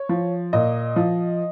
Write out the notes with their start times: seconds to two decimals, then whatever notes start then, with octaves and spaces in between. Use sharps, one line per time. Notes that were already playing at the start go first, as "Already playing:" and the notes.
Already playing: C#5
0.09 F3
0.53 A#2 D#5
0.96 F3